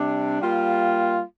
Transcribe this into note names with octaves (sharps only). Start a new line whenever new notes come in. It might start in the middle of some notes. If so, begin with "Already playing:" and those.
Already playing: C3 G3 D4
G3 A#3 F4